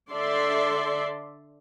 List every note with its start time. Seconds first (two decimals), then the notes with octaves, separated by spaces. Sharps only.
0.10 D3 A4 D5 E5 C6